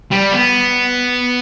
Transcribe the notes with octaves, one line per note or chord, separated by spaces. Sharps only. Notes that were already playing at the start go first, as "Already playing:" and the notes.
G3
B3